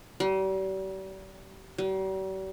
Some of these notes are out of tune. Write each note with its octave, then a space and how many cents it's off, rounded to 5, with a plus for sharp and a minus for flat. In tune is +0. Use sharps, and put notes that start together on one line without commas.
G3 -40
G3 -45